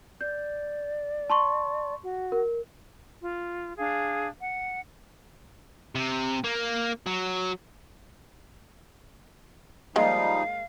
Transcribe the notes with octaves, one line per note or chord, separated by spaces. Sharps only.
D5 G6
A5 C6 C#6
F#4
A#4
F4
D4 G#4 F5
F#5
C3
A#3
F#3
F3 G3 G#3 A#3 D#4 F5